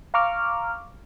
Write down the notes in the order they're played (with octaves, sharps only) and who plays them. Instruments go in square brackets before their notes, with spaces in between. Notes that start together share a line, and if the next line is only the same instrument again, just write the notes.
[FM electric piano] F5 A#5 C#6 D6 F6